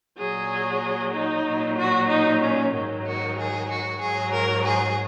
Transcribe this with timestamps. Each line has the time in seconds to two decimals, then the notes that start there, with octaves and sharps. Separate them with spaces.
0.18 A#2 F#3 G#4
1.13 D#4
1.45 A#2 F#3
1.78 F#4
2.09 D#4
2.41 C#4
2.73 G#2 D#3 F#3
3.05 F#4
3.37 G#4
3.69 F#4
4.01 G#2 F#3 G#4
4.33 A#4
4.65 G#4